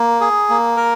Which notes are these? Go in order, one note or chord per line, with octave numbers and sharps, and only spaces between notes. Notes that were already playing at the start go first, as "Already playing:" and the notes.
Already playing: A#3
G#4
A#3
A#4